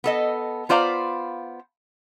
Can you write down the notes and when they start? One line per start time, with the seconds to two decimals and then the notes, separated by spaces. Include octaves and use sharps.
0.04 B3 A4 D#5
0.69 B3 F4 C5 D5 F5 A#5